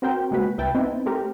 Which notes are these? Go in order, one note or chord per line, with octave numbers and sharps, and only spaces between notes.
C4 F#4 A#4 C5 G5
C#3 G#3 A#3 F#4 B4
C2 E4 B4 E5 G5 A5
B3 C4 D#4 E4
A3 C4 G4 A#4